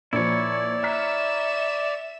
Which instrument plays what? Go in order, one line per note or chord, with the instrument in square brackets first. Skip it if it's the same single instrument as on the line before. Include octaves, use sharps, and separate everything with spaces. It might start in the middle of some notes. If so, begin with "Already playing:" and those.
[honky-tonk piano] A#2 F3 [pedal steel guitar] E4 C#5 [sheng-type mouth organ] D5
[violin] E5 E7 [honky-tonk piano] A#5 F6 B6